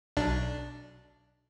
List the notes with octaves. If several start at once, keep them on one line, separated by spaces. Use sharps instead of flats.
B1 D4